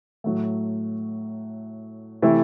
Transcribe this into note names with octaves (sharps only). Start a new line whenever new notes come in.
A2 F#3 A3
C3 E3 A3 C4 E4